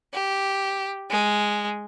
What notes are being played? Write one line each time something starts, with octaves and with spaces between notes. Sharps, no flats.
G4
G#3